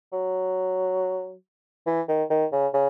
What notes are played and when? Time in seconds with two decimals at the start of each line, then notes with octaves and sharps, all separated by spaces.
0.12 F#3
1.86 E3
2.08 D#3
2.30 D#3
2.52 C#3
2.74 C#3